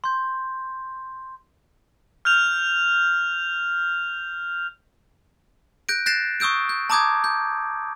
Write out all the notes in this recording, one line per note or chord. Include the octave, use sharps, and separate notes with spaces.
C6 G6
F6 G6 F7
F#6 G6 A#6 D7
F#6 G6 A6 A#6 C7 E7
C#6 D#6 E6 G6 D7
G6
A5 A#5 D6 D#6 G6 G#6
G6